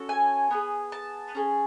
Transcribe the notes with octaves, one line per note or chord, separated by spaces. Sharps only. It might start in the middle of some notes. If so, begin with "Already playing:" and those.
Already playing: C#4 F#4 A4
G#5
B3 D4 G#4
A5
C#4 G#4